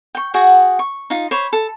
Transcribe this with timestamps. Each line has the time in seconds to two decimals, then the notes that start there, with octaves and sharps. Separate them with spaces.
0.15 G5 C#6
0.34 F#4 G#4 F#5 G5
0.79 C#6
1.10 D#4 F4
1.31 C5 C#5 B5
1.53 A4